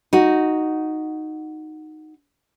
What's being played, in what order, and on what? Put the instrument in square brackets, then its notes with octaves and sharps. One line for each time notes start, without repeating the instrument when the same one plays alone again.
[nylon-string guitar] D#4 F#4